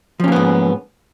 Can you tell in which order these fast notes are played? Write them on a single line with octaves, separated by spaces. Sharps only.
F3 C#4 A#3 B3 G#2